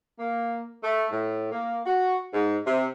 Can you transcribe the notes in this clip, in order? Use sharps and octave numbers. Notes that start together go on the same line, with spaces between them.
A#3
A3
A2
A#3
F#4
G#2
C3